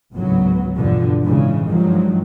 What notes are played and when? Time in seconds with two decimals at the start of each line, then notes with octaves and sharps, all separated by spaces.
0.13 G#1 D2 A2 C#3 F#3 B3
0.77 E2 G2 B2 D3 F3
1.24 A2 C#3 E3 G#3
1.67 G2 D#3 F3 F#3 G#3